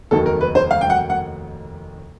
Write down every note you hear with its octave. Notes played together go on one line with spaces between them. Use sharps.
F1 D#2 D#3 F#3 A4
A#4
B4
C5
F5
G5
F#5
F#5